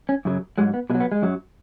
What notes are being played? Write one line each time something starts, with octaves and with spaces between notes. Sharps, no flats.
C#4
F#2 C#3 F#3
G#2 F#3 G#3
B3
B2 F#3 G#3
B3
G#3
F#2 F#3